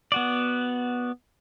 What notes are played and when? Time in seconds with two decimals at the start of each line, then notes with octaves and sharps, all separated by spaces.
0.12 B3 F#4 D5